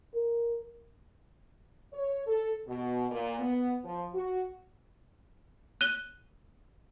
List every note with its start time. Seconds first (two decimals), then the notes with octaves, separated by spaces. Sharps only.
0.14 A#4
1.92 C#5
2.26 A4
2.67 B2
3.11 A#2
3.39 B3
3.84 F3
4.14 F#4
5.81 F#6 D#7 G7